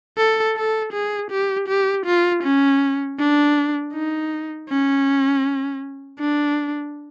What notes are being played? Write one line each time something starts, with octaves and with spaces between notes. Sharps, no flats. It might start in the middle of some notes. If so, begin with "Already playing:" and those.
A4
A4
G#4
G4
G4
F4
C#4
D4
D#4
C#4
D4